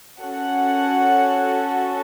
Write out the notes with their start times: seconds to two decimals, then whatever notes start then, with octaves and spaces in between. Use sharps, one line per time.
0.20 C#4 F#4 A4 F#5